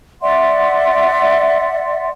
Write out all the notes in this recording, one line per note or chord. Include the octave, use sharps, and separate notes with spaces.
D5 E5 F#5 C6